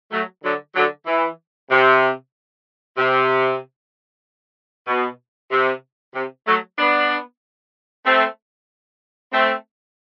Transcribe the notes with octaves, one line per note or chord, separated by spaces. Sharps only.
F#3 A3
D3 F#3
D3 F#3
E3
C3
C3
B2
C3
C3
F#3 A3
B3 D4
A3 C4
A3 C4